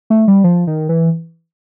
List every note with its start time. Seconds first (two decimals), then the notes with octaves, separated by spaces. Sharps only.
0.10 A3
0.28 G3
0.44 F3
0.67 D#3
0.89 E3